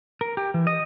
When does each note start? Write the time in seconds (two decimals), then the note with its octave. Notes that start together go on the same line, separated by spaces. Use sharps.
0.21 A#4
0.37 G4
0.54 E3
0.67 D#5